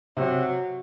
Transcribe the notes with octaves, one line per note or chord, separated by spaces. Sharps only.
C3 F#3